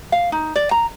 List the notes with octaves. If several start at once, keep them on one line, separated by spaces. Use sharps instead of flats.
F5
D#4
D5
A#5